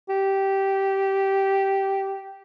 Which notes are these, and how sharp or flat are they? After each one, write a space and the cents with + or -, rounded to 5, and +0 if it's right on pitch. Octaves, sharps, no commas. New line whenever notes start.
G4 -10